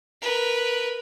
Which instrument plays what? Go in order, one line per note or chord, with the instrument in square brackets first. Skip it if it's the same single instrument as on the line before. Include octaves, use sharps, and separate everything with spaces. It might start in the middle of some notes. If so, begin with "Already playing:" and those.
[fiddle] A#4 B4